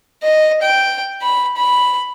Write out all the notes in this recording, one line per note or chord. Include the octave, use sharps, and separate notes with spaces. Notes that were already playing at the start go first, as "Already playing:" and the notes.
D#5
G5
B5
B5